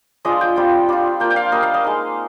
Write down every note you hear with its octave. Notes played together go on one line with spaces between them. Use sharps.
F3 G#3 D4 F4 D#5
G5
G3 C4 F4
G3 D4 F4
A#3 F4 G5
G5
F5
G3 A#3 D4 D#5
F5
D#5
G#3 D#4